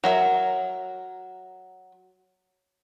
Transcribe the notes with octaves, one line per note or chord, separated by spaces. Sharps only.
F#3 A#4 E5